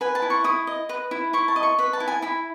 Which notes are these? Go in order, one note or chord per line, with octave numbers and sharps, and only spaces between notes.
B4 G#5
A5
E4
C#6
E4 D#6
D#5
B4
E4
E4 C#6
A5
D#5
C#6
B4 B5
A5
E4
G#5
E4 B5